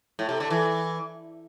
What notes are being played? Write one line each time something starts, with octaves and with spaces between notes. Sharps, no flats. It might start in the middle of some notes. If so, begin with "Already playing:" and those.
A2
C3
D3
E3